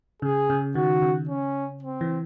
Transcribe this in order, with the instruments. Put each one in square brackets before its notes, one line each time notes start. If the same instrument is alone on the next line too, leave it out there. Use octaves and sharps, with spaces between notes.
[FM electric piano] C#3 [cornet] G#4
[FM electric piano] C#3
[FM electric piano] D#3 [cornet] F#4
[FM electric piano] C#3
[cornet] C#4
C4
[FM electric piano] E3